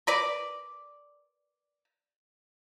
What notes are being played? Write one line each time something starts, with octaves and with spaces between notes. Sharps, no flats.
A#4 B4 D5